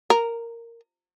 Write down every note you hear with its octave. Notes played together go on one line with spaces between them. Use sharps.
A#4